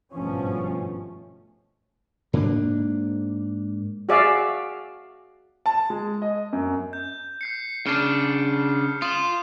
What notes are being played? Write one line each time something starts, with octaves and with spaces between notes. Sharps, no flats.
G#1 G2 B2 F3 A3 C#4
G#2 A#3 C4 D4
F#4 G#4 D5 E5 F5
A5
G#3
D#5
F#2
G6
G6 C7 C#7
C#3 D4 F6 G6 C7
F4 D#6 E7 F#7